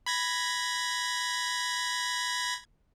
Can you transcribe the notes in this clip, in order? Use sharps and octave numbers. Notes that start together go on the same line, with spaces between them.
B5 G#6 A#6